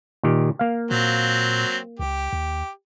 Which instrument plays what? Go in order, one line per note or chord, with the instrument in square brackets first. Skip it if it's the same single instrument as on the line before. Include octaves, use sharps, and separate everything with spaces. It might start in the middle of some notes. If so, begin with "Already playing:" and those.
[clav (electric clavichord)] A#2 D#3 G4
A#3 F5
[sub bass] A#2 [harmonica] F#3 C4
[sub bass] C#2 [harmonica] G4
[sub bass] D#2